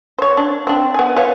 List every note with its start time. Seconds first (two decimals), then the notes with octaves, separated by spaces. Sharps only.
0.19 C5 C#5
0.37 D4
0.67 C4 D4
0.94 B3 G#5
1.16 B4 C#5 F5